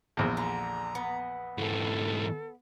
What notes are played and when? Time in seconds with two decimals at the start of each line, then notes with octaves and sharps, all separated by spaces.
0.17 A#1 E2
0.37 D3 A#5
0.95 B3 D#5
1.58 G#2 E3 A4